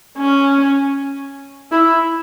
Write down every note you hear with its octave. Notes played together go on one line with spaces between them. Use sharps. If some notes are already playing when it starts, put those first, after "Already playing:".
C#4
E4